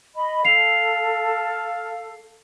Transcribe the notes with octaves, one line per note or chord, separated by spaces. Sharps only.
D#5 B5
A4 F5 C7 F7